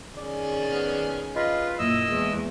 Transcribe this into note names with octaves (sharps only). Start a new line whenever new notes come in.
D#3 C#4 G#4 D5
B3 F6
F4 B4 D#5
F#2 A#2 A#3 E4 D#5 E6
E2 G#3